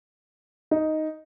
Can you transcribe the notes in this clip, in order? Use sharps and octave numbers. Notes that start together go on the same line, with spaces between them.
D#4